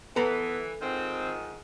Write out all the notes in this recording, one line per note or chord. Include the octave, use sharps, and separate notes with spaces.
E3 B3 A4 B4 A#5
G#2 D#3 C4 F4